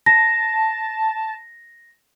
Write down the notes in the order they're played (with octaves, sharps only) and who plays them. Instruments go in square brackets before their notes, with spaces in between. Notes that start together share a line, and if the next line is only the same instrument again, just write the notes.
[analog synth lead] A5 [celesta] A#6